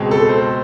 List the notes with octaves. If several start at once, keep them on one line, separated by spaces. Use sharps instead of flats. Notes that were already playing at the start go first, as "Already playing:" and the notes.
Already playing: C#2 B2 G#3 C4
A4
C5